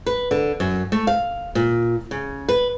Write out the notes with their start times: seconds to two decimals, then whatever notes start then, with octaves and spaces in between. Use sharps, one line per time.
0.06 B4
0.31 D3
0.60 F#2
0.92 A3
1.07 F5
1.55 A#2
2.11 C#3
2.49 B4